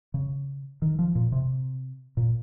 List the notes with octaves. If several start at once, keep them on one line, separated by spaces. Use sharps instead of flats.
C#3
D#3
F3
A#2
C3
A#2